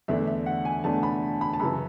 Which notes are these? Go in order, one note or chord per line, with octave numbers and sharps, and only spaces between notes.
E2 D3 A3 D4 E5
E5
F#5
G#5
E2 D3 A3 D4 A5
B5
B5
A5
F#2 C#3 E3 B5